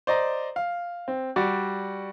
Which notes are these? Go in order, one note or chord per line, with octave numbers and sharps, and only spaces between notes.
C5 D5 D#5 A#5
F5
C4
G3 F#4 D5